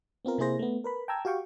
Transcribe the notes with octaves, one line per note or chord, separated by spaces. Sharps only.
B3 C4 F4 A#4
C3 A#3 E4 G#4 C5 A#6
A3 B3
A#4 B4 B5
G5 A5 A#5 E6 G#6
F#4 G4 F5 G5 C#6